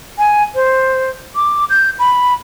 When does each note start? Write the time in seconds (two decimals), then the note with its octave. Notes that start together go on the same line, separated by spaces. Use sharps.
0.18 G#5
0.55 C5
1.35 D6
1.70 G6
1.99 B5